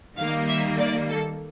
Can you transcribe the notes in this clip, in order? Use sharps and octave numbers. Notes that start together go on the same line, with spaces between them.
D#3 G3 A#3 F5
E5
D5
A4